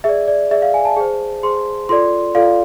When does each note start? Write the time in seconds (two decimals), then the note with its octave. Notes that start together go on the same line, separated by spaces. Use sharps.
0.04 G#4 D5 E5
0.28 D5
0.51 G#4 D5 E5
0.62 F5
0.74 G#5
0.85 A5
0.97 G#4 C5
1.43 G#4 C5 C6
1.89 F4 A4 D5 C6
2.35 F4 A4 D5 F5